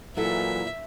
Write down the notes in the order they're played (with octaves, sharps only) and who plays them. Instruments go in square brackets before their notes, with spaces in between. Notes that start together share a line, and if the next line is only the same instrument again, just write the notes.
[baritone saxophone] A#2 [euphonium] E3 [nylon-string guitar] F#3 E4 A4 [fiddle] E5